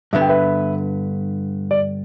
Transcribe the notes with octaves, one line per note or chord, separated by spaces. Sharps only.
G2 D3 B3 E5
G5
B4 E5
D5